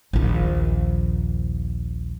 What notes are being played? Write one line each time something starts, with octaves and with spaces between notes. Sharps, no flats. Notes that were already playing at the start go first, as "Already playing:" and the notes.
A#1 D#2